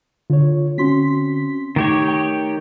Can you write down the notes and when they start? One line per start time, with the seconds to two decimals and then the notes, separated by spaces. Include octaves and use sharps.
0.30 D3 F4 C#5
0.78 D3 C4 C#4 F#4 C6 B6
1.76 D#3 A3 D#4 G4 C#5
2.08 G5